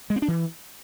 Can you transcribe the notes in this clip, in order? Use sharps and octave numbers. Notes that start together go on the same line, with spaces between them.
G#3
C4
D4
E3